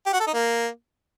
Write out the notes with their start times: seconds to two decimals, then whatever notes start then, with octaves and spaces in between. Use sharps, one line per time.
0.06 G4
0.13 F#4
0.20 A4
0.27 D#4
0.34 A#3